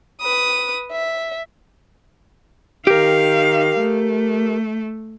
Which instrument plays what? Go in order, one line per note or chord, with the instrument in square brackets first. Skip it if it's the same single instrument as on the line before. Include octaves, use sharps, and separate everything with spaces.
[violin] B4 D#6
E5
[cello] D#3 F5 [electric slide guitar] G4 A#4
[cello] A3